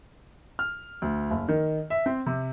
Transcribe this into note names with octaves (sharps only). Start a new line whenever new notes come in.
F6
D2
F#1
D#3
E5
C4
C3